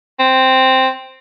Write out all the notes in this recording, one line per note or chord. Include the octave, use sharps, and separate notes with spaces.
C4